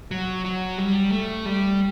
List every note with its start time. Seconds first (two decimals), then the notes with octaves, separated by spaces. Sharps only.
0.11 F#3
0.45 F#3
0.78 G3
1.12 A3
1.46 G3